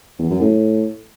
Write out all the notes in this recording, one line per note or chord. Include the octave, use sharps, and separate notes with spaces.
E2
F#2
A2